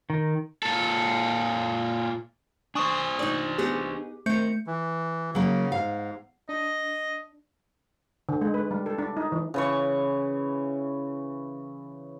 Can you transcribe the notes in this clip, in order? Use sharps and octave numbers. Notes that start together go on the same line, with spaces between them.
D#3
A#2 A4
D4 C5 G#5 C#6 D#6
D#4 D5
B3 D#4 G4 G#4
D#3 A3 C4 G6 C#7
E3
C#3 F#3 A#3
G#2 F5
D4 D#5
D3
G#3
B4
G3
A4
D4
D#4
E3
C#3 E3 C#6